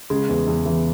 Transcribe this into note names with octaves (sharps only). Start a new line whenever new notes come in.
C#3 G#3
E2
E2
E3